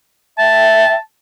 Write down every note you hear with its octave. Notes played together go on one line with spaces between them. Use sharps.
E5 G5 A5